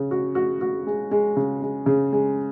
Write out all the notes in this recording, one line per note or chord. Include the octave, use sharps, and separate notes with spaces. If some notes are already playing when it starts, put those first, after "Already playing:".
Already playing: C#3
F#4
F#4
F#4
G#3
G#3
C#3
G#3
C#3
G#3